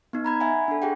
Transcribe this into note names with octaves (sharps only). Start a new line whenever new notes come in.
B3 D#4
A#5 B5 G#6
E5 F#5 G#5 B5
D4 A4
G4 G#4 F#5 G5